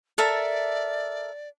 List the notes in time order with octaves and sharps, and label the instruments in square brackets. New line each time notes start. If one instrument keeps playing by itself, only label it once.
[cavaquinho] A4 A#4 E5 [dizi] D5